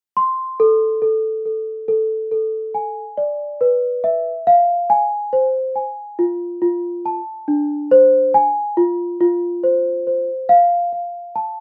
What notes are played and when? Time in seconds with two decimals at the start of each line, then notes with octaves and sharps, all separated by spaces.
0.17 C6
0.60 A4
1.02 A4
1.45 A4
1.88 A4
2.31 A4
2.74 G#5
3.17 D5
3.61 B4
4.04 E5
4.47 F5
4.90 G#5
5.33 C5
5.76 G#5
6.19 F4
6.62 F4
7.06 A5
7.48 D4
7.91 C5
8.34 G#5
8.77 F4
9.21 F4
9.64 C5
10.07 C5
10.49 F5
10.92 F5
11.36 A5